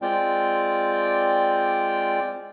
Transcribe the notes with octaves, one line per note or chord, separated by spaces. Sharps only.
G#3 C4 F4 D5 G5